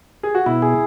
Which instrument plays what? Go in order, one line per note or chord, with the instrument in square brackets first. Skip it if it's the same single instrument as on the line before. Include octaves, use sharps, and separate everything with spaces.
[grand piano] G#4
F#4
[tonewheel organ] B2 [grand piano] E4
[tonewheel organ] G#4